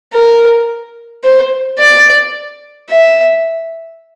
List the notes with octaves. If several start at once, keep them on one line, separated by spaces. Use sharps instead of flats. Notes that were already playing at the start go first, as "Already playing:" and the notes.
A#4
C5
D5
E5